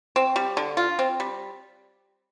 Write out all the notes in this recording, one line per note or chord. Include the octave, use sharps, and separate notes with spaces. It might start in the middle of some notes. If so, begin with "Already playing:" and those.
C4
G3
D3
F4
C4
G3